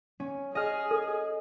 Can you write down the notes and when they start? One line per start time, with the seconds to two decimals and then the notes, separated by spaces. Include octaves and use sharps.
0.20 C#4
0.55 G#4 D#5 F6
0.91 A4